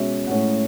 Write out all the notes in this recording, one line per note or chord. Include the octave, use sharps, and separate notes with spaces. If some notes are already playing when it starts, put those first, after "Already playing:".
Already playing: B2 G#3 C#4 E5
A2 G#3 C#4 F#5